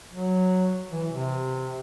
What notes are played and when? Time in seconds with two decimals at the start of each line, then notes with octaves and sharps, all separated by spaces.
0.12 F#3
0.91 E3
1.10 C3